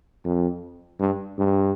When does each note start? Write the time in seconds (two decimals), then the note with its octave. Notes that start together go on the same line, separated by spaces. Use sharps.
0.25 F2
1.00 G2
1.39 G2